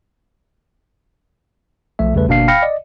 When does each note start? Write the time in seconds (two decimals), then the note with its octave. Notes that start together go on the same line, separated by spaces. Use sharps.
1.99 B1 F3 A3 E5
2.14 E2 C#3 G3 A3 B4
2.28 G1 B2 A#3 D4 F5 C7
2.48 F5 G5 B5 F6 A#6 C#7
2.62 D5 D#5